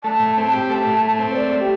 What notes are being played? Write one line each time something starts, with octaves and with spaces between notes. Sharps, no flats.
A3 A5
A2
C4
G4
A3 A5
A2
A3
C4
C5
A3 D5
A3
G4